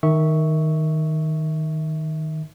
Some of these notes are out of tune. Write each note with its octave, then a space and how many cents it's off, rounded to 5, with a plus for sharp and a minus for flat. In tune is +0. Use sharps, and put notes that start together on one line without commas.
D#3 +0 E5 -15 C#6 +0